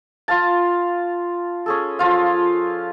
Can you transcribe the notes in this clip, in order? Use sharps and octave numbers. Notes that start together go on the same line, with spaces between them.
F4 F5 A5
C#4 G#4 A4
F3 F4 F5